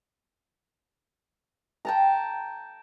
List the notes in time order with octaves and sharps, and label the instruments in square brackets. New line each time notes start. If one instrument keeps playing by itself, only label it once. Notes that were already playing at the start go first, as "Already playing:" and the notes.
[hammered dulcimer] G5 A5 A#5